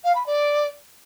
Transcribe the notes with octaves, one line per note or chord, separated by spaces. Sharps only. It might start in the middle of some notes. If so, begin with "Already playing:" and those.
F5
B5
D5